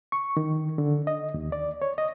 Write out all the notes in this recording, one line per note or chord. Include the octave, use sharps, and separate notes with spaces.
C#6
D#3
D3
D#5
D#2
D5
C#5
D#5